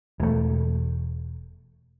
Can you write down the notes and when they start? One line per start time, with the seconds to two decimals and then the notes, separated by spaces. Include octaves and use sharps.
0.20 E1 A3